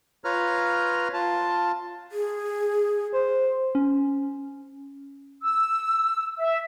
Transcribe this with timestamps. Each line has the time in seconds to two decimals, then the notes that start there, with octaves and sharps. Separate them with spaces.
0.24 F4 B4 C#5 A#5 F6
1.13 F4 A5
2.12 G#4
3.13 C5
3.75 C#4
5.43 E6
6.39 E5